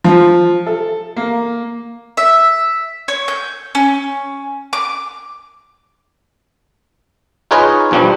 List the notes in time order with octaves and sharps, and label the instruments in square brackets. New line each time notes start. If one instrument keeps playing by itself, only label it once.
[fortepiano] F3
A4
A#3
[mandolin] E5
C#5
G6
C#4
D6
[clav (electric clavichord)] D#4 F4 G#4 B4 C#5 D#5
B1 G2 F3 G3 D4